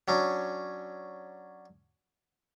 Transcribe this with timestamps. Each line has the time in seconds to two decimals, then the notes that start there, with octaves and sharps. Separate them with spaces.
0.08 F#3 C#4 D4